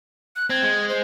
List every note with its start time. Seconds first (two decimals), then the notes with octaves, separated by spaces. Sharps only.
0.36 F#6
0.50 C4 G#6
0.63 G#3
0.89 C5